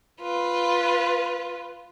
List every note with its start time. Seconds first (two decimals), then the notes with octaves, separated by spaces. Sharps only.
0.21 F4 B4